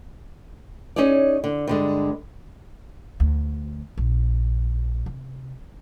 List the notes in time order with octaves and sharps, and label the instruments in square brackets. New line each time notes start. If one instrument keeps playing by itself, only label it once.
[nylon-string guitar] C#4 D#4 G#4 C#5 D5
D3
G2 D3 G#3
[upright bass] D2
A#1
C3